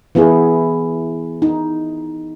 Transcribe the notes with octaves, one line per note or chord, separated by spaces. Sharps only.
E3 B3 E4 G#4
D#4